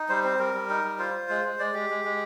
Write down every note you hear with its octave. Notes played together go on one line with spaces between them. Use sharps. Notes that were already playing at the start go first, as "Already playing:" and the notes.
Already playing: D#4
G3 C5
C4 C5
G3 A#4
G3
D#4
G3
F4 C5
F4
G#3
G#3
G#3 D5
G#3 G4
G#3
G#3